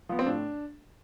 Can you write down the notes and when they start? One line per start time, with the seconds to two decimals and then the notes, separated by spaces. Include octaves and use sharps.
0.09 F3 B3
0.19 C4
0.26 A2 D4